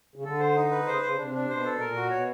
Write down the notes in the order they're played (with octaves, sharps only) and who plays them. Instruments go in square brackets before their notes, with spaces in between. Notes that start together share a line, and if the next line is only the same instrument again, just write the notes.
[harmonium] C#3
[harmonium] D3 [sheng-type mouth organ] A4
[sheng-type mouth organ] C5
D#4
B4
[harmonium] C#3 [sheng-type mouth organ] C5
[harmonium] C#3 [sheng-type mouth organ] C5
[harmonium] C3 [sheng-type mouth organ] D4
[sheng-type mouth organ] D4
[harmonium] B2 [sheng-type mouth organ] C5
[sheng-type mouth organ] A4
[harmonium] A#2 [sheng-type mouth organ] A#4
[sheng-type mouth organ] F#4
[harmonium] B2 [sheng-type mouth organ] C#5